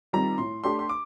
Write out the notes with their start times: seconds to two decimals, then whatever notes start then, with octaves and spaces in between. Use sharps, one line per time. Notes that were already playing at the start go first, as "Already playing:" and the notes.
0.13 D#3 G3 C4 F4 A#5
0.38 A2 C6
0.64 A3 D4 G4 C6
0.79 C6
0.89 D6